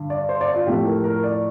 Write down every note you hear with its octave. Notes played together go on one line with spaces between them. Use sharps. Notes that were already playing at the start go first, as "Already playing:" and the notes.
Already playing: G2 D3
D5
C5
D5
F4
A2 F3 A3 G4
A#4
A#4
D5